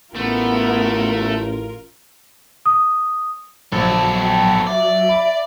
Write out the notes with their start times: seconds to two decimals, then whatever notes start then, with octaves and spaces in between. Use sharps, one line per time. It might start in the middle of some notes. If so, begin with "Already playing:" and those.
0.15 A1 A3 B3 F4 A#4
2.66 D#6
3.72 A#1 F#3 B3 A4
4.19 G5
4.67 D5 E5
5.09 B5